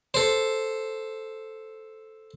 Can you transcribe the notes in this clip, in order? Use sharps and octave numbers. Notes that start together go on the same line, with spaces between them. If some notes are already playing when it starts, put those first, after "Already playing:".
A4 C5